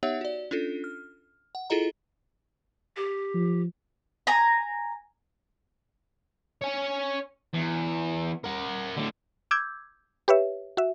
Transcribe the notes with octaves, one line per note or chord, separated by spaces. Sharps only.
B3 D#4 G4 C#5 E5 F#5
F#4 D5
C#4 D4 F4 A4
F6
F#5
E4 F4 G#4 A4 D#5 A#5
G4
F3
G#5 A#5
C#5 G#5
E2
A#4 F#5
A2 D3
D6 E6 G6 G#6
G4 B4 C#5 E5
F#4 E5